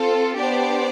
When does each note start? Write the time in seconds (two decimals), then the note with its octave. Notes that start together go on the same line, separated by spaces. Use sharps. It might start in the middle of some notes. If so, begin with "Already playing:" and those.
Already playing: C4 F4 A4
0.38 B3 D4 G4 C5 D5